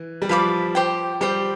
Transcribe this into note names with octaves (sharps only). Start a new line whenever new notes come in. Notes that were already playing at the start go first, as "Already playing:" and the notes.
Already playing: E3
G3
F3 B4 F5 B5 D6
G4 C5 G5
G3 G4 C5 G5